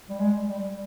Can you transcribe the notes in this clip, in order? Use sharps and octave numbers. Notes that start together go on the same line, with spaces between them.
G3
G#3
G3